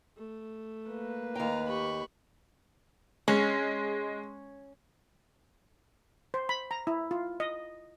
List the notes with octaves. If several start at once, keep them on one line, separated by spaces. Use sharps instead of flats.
A3
A#3 B4
D#2 F5 G5 A#5
G4 B5 C#6
G#3 C#4
C5
B5
A#5
E4
F4
D#5